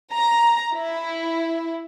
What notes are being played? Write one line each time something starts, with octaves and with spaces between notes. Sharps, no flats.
A#5
E4